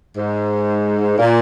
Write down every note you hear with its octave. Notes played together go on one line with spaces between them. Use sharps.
G#2
A#2